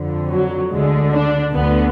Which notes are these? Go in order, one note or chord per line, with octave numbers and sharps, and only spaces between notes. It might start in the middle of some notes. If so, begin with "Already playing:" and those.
Already playing: F2 D3
F#3
D2 D3 G#3
D4
D2 D3 B3